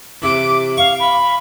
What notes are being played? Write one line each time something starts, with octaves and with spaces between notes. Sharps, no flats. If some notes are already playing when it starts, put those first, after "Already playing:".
C3 E3 D6
F5 C#6
B5